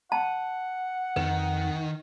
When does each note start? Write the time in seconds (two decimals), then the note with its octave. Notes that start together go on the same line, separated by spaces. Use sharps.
0.12 F#5 A5
1.16 F2 D#3 B4